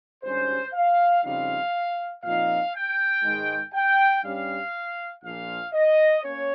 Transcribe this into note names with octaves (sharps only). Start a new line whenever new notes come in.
G#1 G2 G3 C#4 C5
F5
F2 C#3 G3 C4 D#4 F5
A#2 F3 C4 D#4 F5
G5
G#2 D#3 G#3
G5
G2 G3 C#4 F5
A#1 A#2 F3 F5
D#5
A#3 C#4 C#5